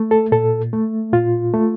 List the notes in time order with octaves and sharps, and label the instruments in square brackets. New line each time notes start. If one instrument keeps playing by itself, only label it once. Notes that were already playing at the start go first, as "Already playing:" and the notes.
Already playing: [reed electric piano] A3
A4
A#2 A4
A3
A#2 F4
A3